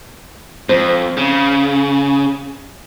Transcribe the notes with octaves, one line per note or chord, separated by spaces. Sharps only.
F2 C5
C#3